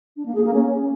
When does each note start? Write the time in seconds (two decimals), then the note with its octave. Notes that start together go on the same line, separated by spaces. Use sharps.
0.16 D4
0.26 A#3
0.35 G#4
0.44 A#3
0.54 C#4